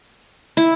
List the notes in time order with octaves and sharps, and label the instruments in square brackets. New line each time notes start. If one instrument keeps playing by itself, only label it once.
[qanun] E4